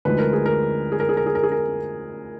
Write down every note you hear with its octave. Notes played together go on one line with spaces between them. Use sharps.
D2 D3 F3 G#3 D#4 B4
A#4
G#4
A#4
G#4
A#4
G#4
A#4
G#4
A#4
G#4
A#4